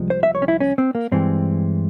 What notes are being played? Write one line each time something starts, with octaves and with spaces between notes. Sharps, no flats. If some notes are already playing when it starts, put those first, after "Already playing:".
Already playing: C2 C3 F3 G#3
C5
E5
C#5
C#4
E4
C#4
C4
A#3
G2 E3 G#3 C4